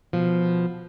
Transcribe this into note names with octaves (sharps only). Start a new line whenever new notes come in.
B2 F3